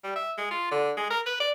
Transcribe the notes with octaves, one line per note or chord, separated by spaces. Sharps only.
G3
E5
G#3
F4
D3
G#3
A#4
B4
D5